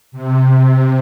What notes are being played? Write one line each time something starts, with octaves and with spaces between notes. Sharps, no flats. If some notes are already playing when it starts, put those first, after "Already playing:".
C3